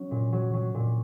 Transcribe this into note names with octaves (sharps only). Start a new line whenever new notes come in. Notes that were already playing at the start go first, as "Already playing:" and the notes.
Already playing: F#3 C#4
A#2
F#3
F#3
A#2